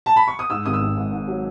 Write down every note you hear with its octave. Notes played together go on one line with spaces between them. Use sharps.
A5
B5
C#6
D#6
G#2 E6
G#1 D#6
E6
G#1
G#2
G#2
F#3